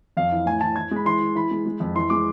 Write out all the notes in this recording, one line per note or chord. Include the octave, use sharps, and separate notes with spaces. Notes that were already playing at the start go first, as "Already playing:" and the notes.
F2 F5
E3
A2 G#5
E3 A5
E3 G#6
G#3 B5
E3 C6
E3
E3 B5
G#3
G#3
F2
E3 C6
G#3 D6